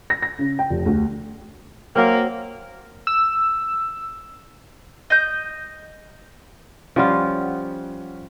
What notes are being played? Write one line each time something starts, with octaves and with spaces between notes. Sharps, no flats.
A#6
A#6
C#3
G5
F1
D2
F#3 A#3 C4
E6
D#5 G6
F3 G3 C#4 F4 F#5